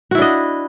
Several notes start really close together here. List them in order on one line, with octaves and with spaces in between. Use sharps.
F#4 E4 D4 D#5